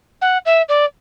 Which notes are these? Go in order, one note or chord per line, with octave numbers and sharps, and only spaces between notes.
F#5
E5
D5